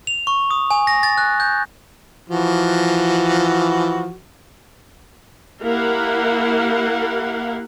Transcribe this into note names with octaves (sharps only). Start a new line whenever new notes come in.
F7
C#6
D#6
G#5
A#6
A6
F#6
G6
E3 F3 F#4
A#3 E4 G4 A#4 F5 F#5